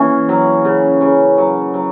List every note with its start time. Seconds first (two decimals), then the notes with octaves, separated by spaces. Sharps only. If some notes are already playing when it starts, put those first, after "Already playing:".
Already playing: E3 A#3 C#4 G#4
0.29 F#3
0.65 C#3
1.01 C#3
1.38 F#3
1.74 F#3